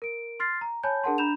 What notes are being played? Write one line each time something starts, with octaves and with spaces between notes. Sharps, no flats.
A#4 D7
C6 F6 A6 C7
A#5
C#5 G#5 A5 B5 G6
D4 G#4 A#4 F#5 A5 C6
D4 A#5 B5 G6 E7 F7